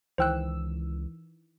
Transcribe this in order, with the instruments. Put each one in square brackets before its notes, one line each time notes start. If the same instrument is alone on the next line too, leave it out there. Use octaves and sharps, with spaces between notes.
[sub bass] C#2 [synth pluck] D#3 E3 E6 [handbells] C5 G5 F#6